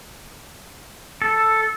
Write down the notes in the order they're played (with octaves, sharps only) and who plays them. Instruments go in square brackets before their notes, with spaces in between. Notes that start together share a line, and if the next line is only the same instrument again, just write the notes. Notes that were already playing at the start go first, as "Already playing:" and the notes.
[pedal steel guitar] A4